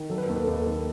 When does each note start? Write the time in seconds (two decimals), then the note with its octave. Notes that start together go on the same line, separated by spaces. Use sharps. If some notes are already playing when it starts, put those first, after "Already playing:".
Already playing: D#3
0.10 F#3 A4
0.18 B4
0.27 D#2 A4
0.36 B4
0.44 D#2 A4
0.53 B4
0.62 A4
0.67 D#3